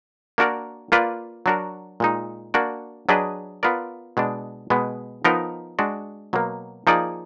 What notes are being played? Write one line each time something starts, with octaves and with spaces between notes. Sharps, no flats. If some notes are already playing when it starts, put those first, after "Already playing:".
A#3 D4 F#4 A#4 D5
A#3 F4 B4 D5
F#3 D4 F#4 A#4
A#2 G#3 D#4
A#3 D4 F#4 D5
F#3 D4 G#4 B4 D#5
B3 F4 A#4 D5
B2 G#3 D4
B2 G#3 B3
F3 B3 D#4 A#4 D#5
G#3 D4 F#4
B2 F#3 A#3
F3 A#3 D#4 G#4 D5